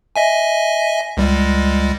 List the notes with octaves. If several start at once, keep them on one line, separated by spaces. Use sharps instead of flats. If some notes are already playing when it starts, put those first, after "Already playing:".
D#5 E5 G#5
C#2 G3 G#3